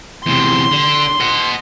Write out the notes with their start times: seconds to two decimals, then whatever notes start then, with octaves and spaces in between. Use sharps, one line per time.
0.26 E2 C3 C6
0.72 D3
1.20 D#5 F#5